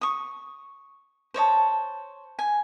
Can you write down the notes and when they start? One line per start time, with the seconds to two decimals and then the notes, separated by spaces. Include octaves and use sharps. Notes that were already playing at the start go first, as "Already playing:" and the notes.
0.01 C#6 D#6
1.34 C5 C#5 D#5 A5
2.39 G#5